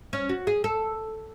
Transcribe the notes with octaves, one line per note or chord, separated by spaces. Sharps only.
C#4
F#4
G#4
A4